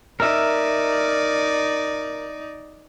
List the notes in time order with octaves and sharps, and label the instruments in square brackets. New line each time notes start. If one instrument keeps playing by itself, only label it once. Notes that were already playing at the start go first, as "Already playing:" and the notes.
[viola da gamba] D#4 D5 [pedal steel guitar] A#4 E5